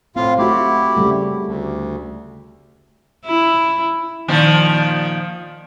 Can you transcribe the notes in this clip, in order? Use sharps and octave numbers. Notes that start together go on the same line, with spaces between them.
A2 C4 F4 F5
A3 E4 F#4 G4
C#3 G3 A3
D2
E4
A#2 D#3 F3